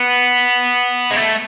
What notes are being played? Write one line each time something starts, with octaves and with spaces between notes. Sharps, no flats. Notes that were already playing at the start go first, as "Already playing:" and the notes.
Already playing: B3
G#3
A3